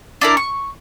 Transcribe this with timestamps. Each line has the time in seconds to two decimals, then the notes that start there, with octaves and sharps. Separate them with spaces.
0.21 D4 E4 A#4
0.37 C#6